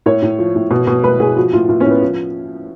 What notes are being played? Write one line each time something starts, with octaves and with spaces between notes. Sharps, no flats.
A2 C#5
A2
F3
A2
B2
B2
B2 B4
B2 G#4
F3 F#4
A2 F4
A2 F4
C#4
A2 B3
F3